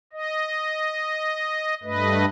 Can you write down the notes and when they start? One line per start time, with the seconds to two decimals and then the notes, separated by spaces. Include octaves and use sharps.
0.13 D#5
1.83 G2 A3 B4 D#5